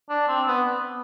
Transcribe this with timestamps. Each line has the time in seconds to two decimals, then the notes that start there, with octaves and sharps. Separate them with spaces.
0.10 D4
0.28 C4
0.47 B3